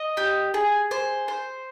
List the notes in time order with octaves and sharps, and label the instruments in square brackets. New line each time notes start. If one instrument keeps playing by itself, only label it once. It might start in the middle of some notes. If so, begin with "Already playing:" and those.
Already playing: [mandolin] D#5
G4
G#4
C5
C5